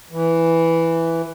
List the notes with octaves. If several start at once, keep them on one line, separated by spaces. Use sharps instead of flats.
E3